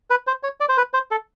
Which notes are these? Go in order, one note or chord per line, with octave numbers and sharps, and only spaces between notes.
B4
C5
C#5
D5
C5
B4
C5
A4